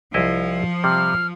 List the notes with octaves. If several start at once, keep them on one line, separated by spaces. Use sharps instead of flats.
C2 F3 E4 D#5
C3 G3 F6